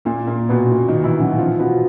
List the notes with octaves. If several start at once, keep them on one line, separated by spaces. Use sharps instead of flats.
A#2 A#3
A#2 A#3
B2 B3
A#2 A#3
D#3 D#4
E3 E4
F#3 F#4
F3 F4
B2 B3